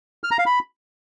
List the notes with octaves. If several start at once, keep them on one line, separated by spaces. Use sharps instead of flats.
F6
A#5
F5
B5